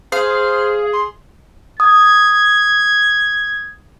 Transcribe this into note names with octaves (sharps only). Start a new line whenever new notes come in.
G#4 C5 F5
C6
D#6 G#6